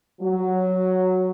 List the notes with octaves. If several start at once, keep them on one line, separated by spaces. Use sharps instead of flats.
F#3